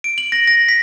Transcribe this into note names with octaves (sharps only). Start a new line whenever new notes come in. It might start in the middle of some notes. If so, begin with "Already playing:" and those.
D7
F#7
A#6
A#6
B6